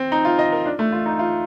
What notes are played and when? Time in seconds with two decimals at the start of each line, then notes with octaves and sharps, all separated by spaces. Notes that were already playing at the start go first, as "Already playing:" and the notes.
Already playing: C4
0.12 D#4
0.25 F4
0.39 D#5
0.52 A#4
0.66 D4
0.79 A3
0.92 F4
1.06 D#4
1.19 F4